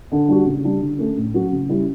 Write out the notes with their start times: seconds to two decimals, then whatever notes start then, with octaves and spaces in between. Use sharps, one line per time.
0.12 D3
0.29 G3 D4 F#4
0.46 C#3
0.64 G3 D4
0.81 D3
0.99 A3 C#4
1.17 A2
1.34 F#3 C#4 F#4
1.52 C#3
1.69 G3 C#4 E4